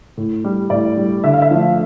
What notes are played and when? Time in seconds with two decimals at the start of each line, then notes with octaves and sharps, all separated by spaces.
0.17 A2
0.44 G3
0.70 A2 D5
0.97 G3
1.23 D3 E5
1.33 F5
1.42 E5
1.51 F3 A3